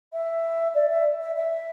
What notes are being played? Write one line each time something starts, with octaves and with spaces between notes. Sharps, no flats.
E5
D5
E5
E5
E5